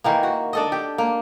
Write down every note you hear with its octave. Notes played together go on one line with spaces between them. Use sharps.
D#3 E3 A#3
F#4
D4 A4 D#5
G4
A#3